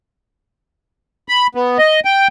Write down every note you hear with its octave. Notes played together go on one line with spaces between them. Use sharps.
B5
B3
D#5
G5